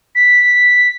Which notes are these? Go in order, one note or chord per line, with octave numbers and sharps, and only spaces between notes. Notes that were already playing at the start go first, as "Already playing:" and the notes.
B6